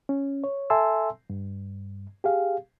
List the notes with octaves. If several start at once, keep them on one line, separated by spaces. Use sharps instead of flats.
C#4
C#5
A4 E5 G#5 A5 C6 E6
G2
G4 G#4 F5